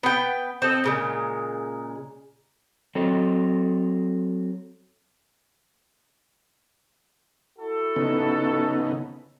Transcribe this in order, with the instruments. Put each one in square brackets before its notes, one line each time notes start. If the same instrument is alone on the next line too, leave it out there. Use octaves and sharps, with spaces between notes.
[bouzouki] B3 B4 G5
C4 A4 D#5
A#2 C#3 G#3
[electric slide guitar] F#3 C4 A4
[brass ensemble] E4 F#4 A4
[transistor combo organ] C#3 B3 D#4